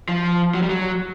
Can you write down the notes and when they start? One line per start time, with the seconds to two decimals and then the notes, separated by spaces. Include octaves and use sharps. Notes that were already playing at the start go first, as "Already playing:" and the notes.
0.09 F3
0.54 F#3
0.62 G3
0.70 F#3